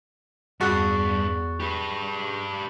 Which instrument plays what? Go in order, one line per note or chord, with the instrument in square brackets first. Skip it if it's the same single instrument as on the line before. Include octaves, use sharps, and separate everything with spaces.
[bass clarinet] E2 [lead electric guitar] G2 [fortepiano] F#4 F#5 [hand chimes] G#4 C#6 A6
[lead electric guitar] G4 B4